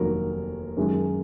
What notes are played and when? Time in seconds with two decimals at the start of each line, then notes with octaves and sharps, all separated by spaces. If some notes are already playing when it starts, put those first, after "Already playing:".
Already playing: F1 D#2 D#3 F#3 A#4
0.77 F#2 D#3 G#3 C#4